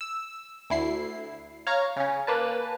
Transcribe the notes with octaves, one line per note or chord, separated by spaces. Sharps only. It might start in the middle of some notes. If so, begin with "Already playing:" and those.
E6
D2 E4 C7
C#5 F5 A#5 C#6 F6
C#3 C#4
A#3 B4 A5